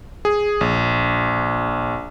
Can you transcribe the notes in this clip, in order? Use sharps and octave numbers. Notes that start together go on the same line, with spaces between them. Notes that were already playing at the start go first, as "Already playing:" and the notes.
G#4
A#1